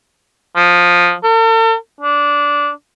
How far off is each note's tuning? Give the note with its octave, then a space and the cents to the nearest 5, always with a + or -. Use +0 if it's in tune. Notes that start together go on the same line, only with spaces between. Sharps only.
F3 +10
A4 +45
D4 -15